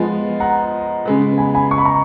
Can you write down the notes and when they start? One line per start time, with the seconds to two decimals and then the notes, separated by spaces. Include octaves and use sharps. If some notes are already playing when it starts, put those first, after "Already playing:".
Already playing: F3 G#3 B3
0.40 F#5 A#5
1.05 C#3 G#3 B3
1.38 G#5 B5
1.55 G#5 B5
1.71 C#6
1.78 B5
1.85 A#5 C#6